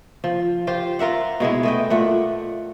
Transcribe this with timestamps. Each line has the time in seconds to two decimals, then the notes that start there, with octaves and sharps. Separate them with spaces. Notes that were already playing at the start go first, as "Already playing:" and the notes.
0.24 F3
0.67 F4 G4 C5
0.99 F4 A#4 E5 F#5
1.40 B2 G#3 B3 E4
1.63 A3 D#5 G5
1.90 A#2 A3 F#5